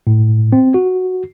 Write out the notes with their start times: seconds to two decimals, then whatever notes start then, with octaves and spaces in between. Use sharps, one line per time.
0.07 A2
0.53 C4
0.74 F#4